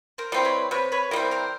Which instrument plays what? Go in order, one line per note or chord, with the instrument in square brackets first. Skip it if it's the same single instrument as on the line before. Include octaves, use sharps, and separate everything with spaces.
[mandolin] A#4 C5
[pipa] E3 G3 C4 [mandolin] C5
[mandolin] B4 C#5
[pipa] C3 [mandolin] B4 C#5
[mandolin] B4 C#5
[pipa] E3 G3 C4 [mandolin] A#4 C5
[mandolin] A#4 C5